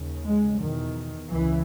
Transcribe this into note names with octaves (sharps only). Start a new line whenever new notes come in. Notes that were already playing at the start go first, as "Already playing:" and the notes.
Already playing: D#2 C#3
G#3
E2 B2 D#3
C#2 C#3 E3